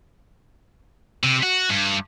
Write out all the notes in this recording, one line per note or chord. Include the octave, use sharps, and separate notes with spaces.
C3
F#4
G2